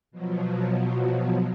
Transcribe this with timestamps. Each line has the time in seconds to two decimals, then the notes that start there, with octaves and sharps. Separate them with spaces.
0.11 B2 F3 F#3